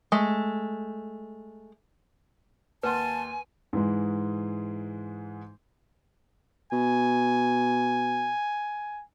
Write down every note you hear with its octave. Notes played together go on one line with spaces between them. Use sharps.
G#3 A3
D#2 B4 F#5 G#5 A5 C6
G#2 E3 G#3
B2 G#5